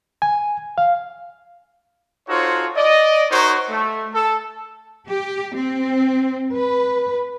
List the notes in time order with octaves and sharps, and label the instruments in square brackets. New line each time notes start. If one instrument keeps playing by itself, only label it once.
[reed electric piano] G#5
F5
[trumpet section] D#4 F4 F#4 A4 C5 C#5
D5 D#5
D#4 F#4 A#4 C5 C#5
A3
A4
[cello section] G4
C4
B4